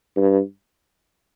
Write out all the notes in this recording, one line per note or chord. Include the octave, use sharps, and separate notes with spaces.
G2